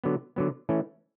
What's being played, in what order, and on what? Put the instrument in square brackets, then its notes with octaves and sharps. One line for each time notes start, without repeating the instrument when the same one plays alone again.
[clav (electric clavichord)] D3 F#3 B3
D3 F#3 B3
E3 A3 C#4